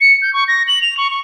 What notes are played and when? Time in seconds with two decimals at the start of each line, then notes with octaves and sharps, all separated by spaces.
0.01 C#7
0.22 G6
0.33 C#6
0.48 A#6
0.68 F#7
0.82 F7
0.97 C#6
1.11 C#6